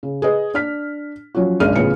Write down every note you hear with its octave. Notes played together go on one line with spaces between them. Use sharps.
C#3
G#4 B4 D#5
D4 F6 B6
F3 F#3 C#4 F4 F#4
G#1 C#2 C#3 D4 F6 D#7
A1 C#3 B3 F4 C#7